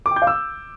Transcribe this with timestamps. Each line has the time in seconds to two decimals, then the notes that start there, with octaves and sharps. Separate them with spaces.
0.06 D6
0.11 G5
0.16 G6
0.22 F5
0.27 E6